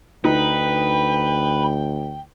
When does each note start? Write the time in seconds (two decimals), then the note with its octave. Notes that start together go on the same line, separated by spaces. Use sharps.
0.24 D2 D#4 B4 G5